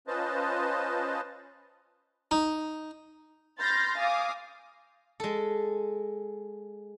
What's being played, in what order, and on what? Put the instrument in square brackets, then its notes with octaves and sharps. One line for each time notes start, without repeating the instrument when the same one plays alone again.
[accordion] C#4 F4 B4 C5 D#5 A5
[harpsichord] D#4
[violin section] B5 C6 F6 G6 A6 A#6
F5 G#5 D6 D#6
[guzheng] G#3 A4